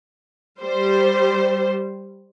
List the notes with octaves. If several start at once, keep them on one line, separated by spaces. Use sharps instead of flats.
G3 C5